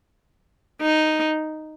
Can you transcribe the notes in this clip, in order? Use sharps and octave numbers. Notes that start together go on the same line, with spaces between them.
D#4